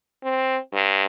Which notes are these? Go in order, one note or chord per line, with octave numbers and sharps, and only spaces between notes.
C4
G2